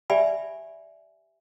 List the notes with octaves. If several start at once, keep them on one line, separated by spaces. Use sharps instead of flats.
G4 D5 E5 G#5 B5